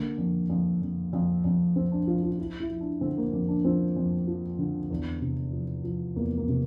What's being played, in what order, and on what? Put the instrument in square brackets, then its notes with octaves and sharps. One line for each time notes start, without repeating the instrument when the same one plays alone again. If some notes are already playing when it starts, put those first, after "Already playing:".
Already playing: [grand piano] D3 A#3
F2
F2
F2
F2
F2
F2 C4
D4
F3 F4
F4
F3 E4
E4
F3
D4
D3 C4
A#3
F2 A#3
D4
F3 C4
F2
F3
D3
E2
C3
F3
F3
E2 A#3
A#3
C3